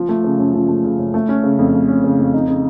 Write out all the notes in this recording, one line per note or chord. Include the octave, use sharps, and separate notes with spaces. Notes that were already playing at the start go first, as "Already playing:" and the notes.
Already playing: F3
A3
C#3
F#2
F3
A3
C#3
F#2
A3
C#4
C#3
F2
A3
C#4
C#3
F2
D#4
C#3